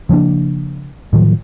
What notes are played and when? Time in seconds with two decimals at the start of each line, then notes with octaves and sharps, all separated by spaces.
0.09 C#3 F3 A#3 D4
1.13 A2 D#3 F3 F#3